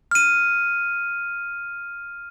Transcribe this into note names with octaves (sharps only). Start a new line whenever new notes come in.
F6 D#7